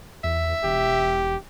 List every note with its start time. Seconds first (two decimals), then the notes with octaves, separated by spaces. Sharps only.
0.24 E2 E5
0.64 E1 G4